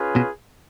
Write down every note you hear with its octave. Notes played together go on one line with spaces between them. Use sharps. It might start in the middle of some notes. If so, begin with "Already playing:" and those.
Already playing: C#4 F4 G#4 B4
B2